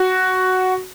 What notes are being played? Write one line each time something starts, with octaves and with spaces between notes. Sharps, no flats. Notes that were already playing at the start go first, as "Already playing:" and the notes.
Already playing: F#4